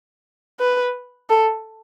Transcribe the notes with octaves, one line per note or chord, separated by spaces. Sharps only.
B4
A4